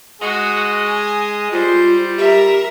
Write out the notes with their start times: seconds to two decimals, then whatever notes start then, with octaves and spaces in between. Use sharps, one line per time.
0.21 G#3 F#4 D#5
0.84 G#5
1.52 G3 F4 C5
2.18 G4 A#4 E5